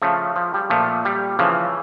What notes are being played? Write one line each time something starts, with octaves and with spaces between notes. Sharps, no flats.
C#3 F3 A3
F3
G3
A#2 F3 A3
G3
C#3 E3 F3